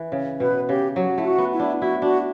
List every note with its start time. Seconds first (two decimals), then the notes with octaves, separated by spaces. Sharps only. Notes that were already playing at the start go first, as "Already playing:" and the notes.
Already playing: E3
0.12 C#3
0.40 B2 B4
0.69 C#3 G4
0.96 F#3 F#4
1.18 A3 E4
1.25 F#4
1.38 B3
1.53 E4
1.60 D4
1.81 E4 F#4
2.02 D4 F#4